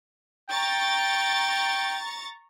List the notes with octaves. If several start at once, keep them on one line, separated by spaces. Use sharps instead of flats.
G5 A#5 C#6 A6